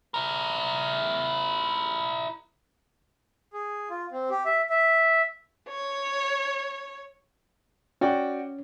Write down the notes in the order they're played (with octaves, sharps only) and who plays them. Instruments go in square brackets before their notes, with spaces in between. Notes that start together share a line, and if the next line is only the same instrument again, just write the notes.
[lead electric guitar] E4 A#4
[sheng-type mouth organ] G#4
F4
C4
G4
E5
E5
[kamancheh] C#5
[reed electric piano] C#4 [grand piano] F#4 D5 G5